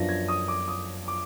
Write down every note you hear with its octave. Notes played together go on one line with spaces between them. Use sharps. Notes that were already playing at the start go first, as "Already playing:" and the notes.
Already playing: F#2 F3 B3 D4 F4 A#6
G#6
D#6
D6
D#6
D6